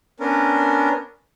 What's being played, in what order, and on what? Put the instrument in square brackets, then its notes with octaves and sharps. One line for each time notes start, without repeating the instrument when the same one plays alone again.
[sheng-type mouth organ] B3 C#4 D4 A#4